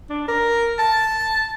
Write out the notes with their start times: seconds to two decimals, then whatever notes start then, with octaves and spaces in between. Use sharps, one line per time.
0.10 D4
0.28 A#4
0.79 A5